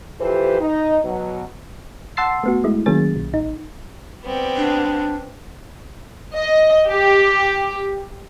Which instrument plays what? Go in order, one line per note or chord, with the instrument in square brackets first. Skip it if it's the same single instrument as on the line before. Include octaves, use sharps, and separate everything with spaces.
[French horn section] E3 F3 G4 A4 B4 C5
D#4
B2 F#3
[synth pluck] F#5 A5 C6 E6 A6 C7
A3 B3 F#4
G#3 A3 E4
D#3 F#3 A#3 C#4 G#4 A6
B1
A1 D#4
[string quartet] G3 B3 C4
[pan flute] D4
[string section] D#5
G4